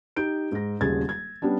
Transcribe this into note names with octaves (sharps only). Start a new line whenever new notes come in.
D#4 G4 G6 D7
G#2 A#6
D#1 G#1 C#3 G#3 G#6 A6
G#6
G3 B3 C#4 D4